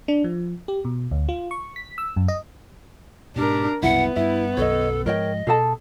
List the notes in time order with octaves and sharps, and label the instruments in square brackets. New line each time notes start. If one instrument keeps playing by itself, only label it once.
[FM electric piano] D4
F3
G4
B2
D2
F4
C#6
B6
E6
F#2
D#5
[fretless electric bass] G#2 B2 [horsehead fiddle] D4 A#4 [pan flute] G4
[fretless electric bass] C2 F#2 B2 [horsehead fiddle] B3 [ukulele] E4 [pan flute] F#5
[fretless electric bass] G2 [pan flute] E4 [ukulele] E5
[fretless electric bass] B1 F#2 [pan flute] A4 [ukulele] C#5 D#5
[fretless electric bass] G#2 F3 G#3 [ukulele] A#4 C#5 G5 [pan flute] D#5
[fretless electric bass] B2 [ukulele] G#4 A4 A5